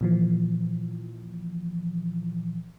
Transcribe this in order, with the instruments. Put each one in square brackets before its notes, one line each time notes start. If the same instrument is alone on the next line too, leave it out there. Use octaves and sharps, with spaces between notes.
[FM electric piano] A#2 E3 F3